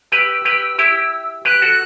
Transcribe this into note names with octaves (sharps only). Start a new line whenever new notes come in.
G4 B4 E6
G4 B4
E4 G4
G4 B4 F#6
F#4 A4